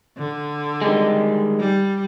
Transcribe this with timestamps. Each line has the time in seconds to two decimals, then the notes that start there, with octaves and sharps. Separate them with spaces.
0.18 D3
0.82 D#3 G3 G#3
1.60 G3